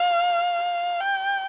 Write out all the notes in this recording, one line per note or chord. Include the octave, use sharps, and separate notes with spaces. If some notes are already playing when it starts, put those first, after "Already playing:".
Already playing: F5
G5